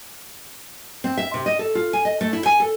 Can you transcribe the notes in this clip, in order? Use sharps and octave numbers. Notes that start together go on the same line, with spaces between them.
C4
E5
C3
D#5
A4
F4
G#5
D#5
A3
E4
G#5
A4